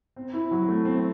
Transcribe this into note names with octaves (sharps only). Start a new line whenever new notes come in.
C4
E4
F#3
A3
C4